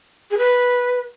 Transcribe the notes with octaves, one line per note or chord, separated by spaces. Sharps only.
G#4
B4